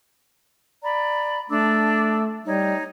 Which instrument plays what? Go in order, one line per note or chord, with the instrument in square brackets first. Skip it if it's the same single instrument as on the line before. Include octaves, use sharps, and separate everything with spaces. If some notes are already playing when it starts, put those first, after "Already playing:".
[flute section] D5 A#5 B5
[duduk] A3 [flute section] D4 D6 E6
[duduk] G3 [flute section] D#4 C#5